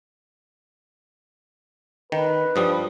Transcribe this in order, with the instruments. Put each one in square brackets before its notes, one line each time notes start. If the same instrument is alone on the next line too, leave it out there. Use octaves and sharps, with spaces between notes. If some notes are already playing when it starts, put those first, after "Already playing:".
[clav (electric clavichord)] D#3 [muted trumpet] B4
[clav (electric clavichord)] G2 F3 G3 [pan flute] D#6